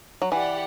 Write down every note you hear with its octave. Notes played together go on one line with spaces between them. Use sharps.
F#3
E3 G4 D5 F#5